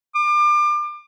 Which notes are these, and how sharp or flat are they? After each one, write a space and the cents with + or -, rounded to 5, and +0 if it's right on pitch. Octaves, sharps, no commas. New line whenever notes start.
D6 +30